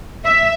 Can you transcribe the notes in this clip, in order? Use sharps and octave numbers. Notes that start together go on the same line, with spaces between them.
E5